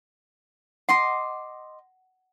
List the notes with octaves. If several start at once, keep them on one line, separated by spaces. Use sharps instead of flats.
D#5 F#5 C6 D6